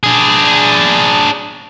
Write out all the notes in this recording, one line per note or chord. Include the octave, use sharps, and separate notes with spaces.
D4 G#4